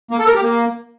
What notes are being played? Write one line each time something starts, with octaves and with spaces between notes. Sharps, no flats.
A#3
A4
A#4
G4
A#3